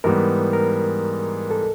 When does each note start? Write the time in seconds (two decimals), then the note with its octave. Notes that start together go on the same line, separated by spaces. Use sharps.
0.04 G#2 E3 G3 B3 A#4
0.53 A#4
1.51 A4